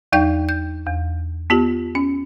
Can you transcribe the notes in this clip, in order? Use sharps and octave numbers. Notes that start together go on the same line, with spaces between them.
E2 F#3 D#4 D5 G5 G6
G6
E2
B3 F4 G4
C#4